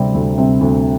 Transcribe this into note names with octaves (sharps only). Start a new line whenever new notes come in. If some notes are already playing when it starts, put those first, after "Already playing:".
Already playing: D2 C3 G3 C4
D2
C3 G3 C4
D2